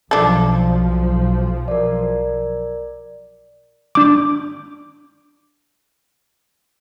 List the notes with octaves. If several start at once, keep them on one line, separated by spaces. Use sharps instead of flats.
B1 F3 D4 A4
A#4 D5
D4 D6